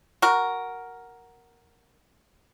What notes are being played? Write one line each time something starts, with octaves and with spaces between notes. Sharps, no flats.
F#4 A#4